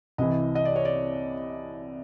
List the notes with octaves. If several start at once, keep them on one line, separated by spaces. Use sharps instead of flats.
C2 C3 E3 D#5
D#5
D5
C#5
D5